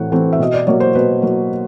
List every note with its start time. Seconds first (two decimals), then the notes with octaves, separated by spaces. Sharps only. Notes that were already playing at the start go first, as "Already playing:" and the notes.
Already playing: A2 E3 A3 C4 F#5
0.12 E3 A3 C4
0.33 E5
0.39 B2 D#5
0.54 D5
0.67 F#3 A#3 C#5
0.80 C5
0.95 B2 B4
1.22 F#3 A#3